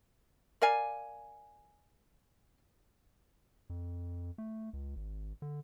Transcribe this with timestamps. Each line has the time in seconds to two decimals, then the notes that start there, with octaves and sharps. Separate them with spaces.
0.62 A#4 D5 F5 G#5
3.70 F2
4.38 A3
4.73 C#2
4.96 G#1
5.42 D3